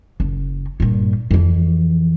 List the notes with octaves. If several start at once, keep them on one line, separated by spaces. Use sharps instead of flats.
F#1
G2 A#2
F2 E3